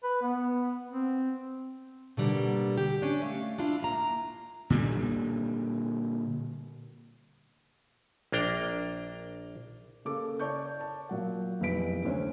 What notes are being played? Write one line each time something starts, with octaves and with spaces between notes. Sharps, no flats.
B4
B3
C4
B2 D3 G3 A#3
G4
C#4 D4
A3 F5
D4 E4 F4
A#3 A#5
A#2 D3 G3
A#1 A#3 D4 G5 A#5
C#3 A#3 A4 D6
C#5 D5 A5 C#6 G6
A5
A#2 F#3 F#5
F1 B1 E3 B4 B6 D7
D2 C#4 C5